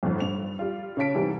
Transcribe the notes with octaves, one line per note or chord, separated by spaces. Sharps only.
G1 F2 G#2 F3
G2 F7
G3 F4
C#3 F4 C#5 A5 B6 D7
G#2 C3 E3 G3 E4